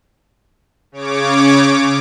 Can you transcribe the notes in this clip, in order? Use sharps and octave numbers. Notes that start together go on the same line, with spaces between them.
C#3 C#5 D6